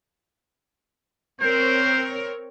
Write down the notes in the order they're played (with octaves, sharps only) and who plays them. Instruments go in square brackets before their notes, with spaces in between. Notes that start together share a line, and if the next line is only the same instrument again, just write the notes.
[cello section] C4 A#4 C#5 [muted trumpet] C5